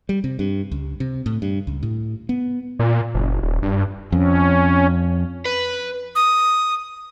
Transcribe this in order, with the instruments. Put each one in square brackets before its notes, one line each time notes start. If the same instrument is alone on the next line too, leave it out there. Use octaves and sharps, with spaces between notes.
[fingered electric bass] G3
C3
G2
C#2
C3
A2
G2
C#2
A2
B3
[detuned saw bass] A#2
F#1
D#1
G2
[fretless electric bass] F2 [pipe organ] C#4
[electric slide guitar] B4
[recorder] D#6